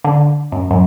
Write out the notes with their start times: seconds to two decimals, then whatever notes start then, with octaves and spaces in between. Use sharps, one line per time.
0.04 D3
0.52 F#2
0.71 F#2